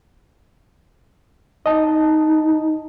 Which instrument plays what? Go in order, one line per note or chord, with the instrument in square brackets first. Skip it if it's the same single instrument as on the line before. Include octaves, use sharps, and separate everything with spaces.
[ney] D#4 [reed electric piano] D#5 A5